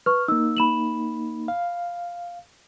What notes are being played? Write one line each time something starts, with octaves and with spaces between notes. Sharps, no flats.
B4 C#6 F6
A#3 D#4 E6
B5 E7 F#7
F5